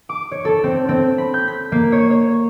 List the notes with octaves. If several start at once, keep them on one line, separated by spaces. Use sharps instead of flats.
D6
C#5
A4
C4
C4
B5
G6
B6
A#3
C#5
C#5